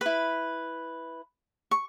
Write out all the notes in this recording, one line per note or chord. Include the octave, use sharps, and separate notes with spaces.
E4 B4 B5
C#6